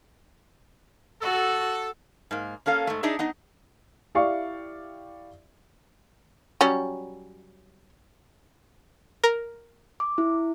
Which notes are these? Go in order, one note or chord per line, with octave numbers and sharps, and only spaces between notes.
F#4 A4
G#2 A#3
A#3 C#4 A4 F5
G#2 A3
D4 D#4 G#4 D#5 E5
B3 D#4 D#5
E4 G4 D5 E5 F5 C#6
F#3 G3 C#4
A#4
D6
E4